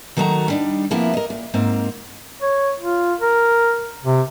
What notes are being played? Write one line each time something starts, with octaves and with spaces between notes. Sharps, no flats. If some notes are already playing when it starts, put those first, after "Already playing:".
D#3 F#3 A3 F#4 A5 A#5
G3 D4 D#4
C3 F3 A#3 B3 E4
A#4 D#5
A#2
G#2 A#3 C4
C#5
F4
A#4
C3